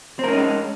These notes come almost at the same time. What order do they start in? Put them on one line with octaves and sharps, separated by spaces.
C4 A#4 C#4 D#4 G#3